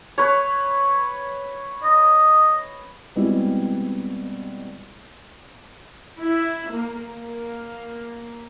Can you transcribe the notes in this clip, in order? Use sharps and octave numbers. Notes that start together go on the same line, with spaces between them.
B4 C#5
D#5
B2 G3 G#3 C4 E4 G4
E4
A#3
A#3